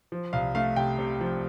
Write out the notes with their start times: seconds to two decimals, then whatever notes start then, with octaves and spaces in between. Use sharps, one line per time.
0.12 F3
0.33 C2 F5
0.55 A3 F5
0.76 C3 G5
0.99 C3
1.21 F3